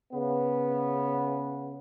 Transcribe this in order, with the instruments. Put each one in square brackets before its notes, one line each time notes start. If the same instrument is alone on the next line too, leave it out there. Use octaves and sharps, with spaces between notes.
[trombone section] C#3 B3